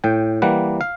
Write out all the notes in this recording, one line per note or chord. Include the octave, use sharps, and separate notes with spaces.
A2 G5
E3 G3 A#3 F#5
F5